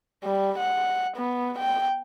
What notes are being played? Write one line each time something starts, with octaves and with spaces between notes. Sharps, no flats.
G3
F#5
B3
G5